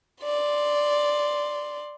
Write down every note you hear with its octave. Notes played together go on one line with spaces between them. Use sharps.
D5 C6